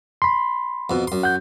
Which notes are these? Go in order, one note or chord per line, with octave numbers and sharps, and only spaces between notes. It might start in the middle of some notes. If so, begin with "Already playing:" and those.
B5 C6
F2 B2
F#2 C6
F#5 G6